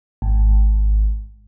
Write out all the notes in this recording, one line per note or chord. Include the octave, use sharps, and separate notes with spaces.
G#1